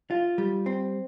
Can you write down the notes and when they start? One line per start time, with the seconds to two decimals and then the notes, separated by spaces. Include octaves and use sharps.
0.11 F4
0.38 G3
0.66 C4